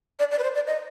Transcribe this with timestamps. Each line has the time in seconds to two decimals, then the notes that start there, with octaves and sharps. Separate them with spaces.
0.19 D5
0.31 D5
0.39 B4
0.43 C5
0.55 D5
0.67 D#5